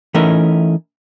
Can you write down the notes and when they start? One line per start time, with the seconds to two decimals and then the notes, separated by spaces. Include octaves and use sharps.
0.14 E3 A3 C#4 D#4 A#4